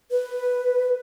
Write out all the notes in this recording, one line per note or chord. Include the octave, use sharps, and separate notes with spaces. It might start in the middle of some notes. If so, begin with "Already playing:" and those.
B4